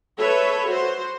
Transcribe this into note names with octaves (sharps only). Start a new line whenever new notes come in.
A4 B4 C#5 E5
F#4 C5